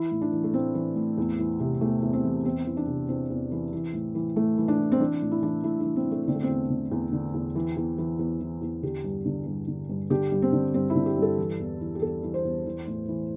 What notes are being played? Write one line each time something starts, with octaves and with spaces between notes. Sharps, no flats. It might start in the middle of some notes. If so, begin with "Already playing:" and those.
Already playing: E3 E4
A2
D4
E3
A3
A2 C4
E3
A2
E2
E3
C3
E2 A3
E2
C4
E3
E2 C4
E3
D4
C3
E2 C4
E2
E3
E3
A2
E3
A2 A3
E3
D4
A2
C4
E3 D4
A2
E4
E3 D4
A2 E4
D4
E3
C4
A2
A3
D3 C4
A3
C4
E2
D3
E2
D3
E2
E3
E2
E3
E2
E3
E2
D3 G4
G2
D3
G2
D3
G2
D3 G4
G2
C4
D3
G2 C4
E4
D3
G4
G2
A4
E3
E2
E3
G4
E2 A4
E3
C5
E2
E3
A2
E3